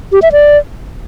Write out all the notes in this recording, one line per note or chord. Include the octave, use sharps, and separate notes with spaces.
G4
E5
D5